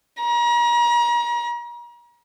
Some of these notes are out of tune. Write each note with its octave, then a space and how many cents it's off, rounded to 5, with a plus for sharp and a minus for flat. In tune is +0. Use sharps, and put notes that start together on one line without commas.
A#5 +35